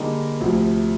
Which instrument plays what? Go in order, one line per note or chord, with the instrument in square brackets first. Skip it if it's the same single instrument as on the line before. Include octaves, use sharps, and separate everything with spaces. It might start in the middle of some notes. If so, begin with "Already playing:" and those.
Already playing: [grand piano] D3 G3 A#3 D#4 G#4
D2 C3 F3